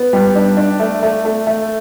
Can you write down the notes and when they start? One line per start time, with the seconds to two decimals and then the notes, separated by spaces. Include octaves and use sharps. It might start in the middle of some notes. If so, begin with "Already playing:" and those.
Already playing: B3
0.13 G3
0.35 D4
0.57 D4
0.80 A3
1.03 A3
1.25 A3
1.47 A3